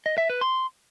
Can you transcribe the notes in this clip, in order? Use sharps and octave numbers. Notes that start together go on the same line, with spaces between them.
D#5
E5
B4
C6